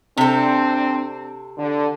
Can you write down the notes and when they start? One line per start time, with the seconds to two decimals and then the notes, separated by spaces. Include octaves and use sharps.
0.17 C3 C4 D4 A4
1.57 D3